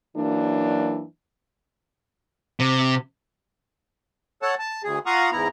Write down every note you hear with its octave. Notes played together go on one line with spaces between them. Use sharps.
F#2 E3 F#3 A#3 D4
C3
A4 C#5 F#5 A5
A5
D2 G#4
F4 F5 F#5 A#5 C#6 D#6
E2 G#2 B3 E4 A#5